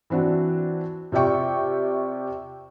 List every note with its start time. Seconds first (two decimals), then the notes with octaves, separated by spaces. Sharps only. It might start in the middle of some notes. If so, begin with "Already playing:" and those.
0.10 E3 C4 D4 F#4
1.12 C3 F4 D5 E5 G5 C#6